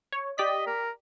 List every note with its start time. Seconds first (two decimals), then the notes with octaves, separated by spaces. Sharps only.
0.12 C#5
0.38 G4 D5 D#5 B6
0.67 A#4